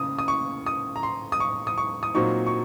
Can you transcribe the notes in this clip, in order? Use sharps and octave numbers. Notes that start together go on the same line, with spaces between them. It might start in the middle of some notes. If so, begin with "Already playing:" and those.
Already playing: C#3 D#6
D#6
C#6
D#6
A#5
C6
D#6
C#6
D#6
C#6
D#6
A#2 F#3 C4 D#4 C#6
C#6